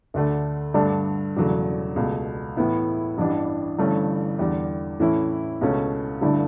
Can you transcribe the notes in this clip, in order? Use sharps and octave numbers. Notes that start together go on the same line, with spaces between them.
D2 D3 A3
G2 D3 A3 D4
E1 E2 C#3 F#3 A3
C#2 B2 A3
A2 E3 B3 E4
A1 G2 E3 G3 D4
G1 G2 E3 A3 C#4
E2 D3 G3
A2 E3 A3 C#4 E4
C#2 B2 A3 C#4
G1 G2 D3 A3 E4